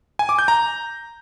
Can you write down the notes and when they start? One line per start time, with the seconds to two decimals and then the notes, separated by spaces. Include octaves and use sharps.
0.19 G#5
0.29 D6
0.39 G6
0.48 A#5